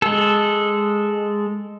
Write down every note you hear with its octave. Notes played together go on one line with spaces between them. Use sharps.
G#3 A4